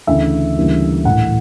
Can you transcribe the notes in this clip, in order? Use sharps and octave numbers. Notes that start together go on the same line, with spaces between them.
D2 C#3 E3 E5
D2 C#3 E3 G3 A#3
A#1 A2 E3 F#5